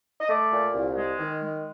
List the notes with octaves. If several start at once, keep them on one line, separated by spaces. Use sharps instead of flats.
D#5
A3 D5
A#2
C2
G#3
D#3
G#3